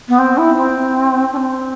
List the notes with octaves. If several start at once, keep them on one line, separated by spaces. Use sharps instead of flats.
B3
C4
E4
C4
D4
C4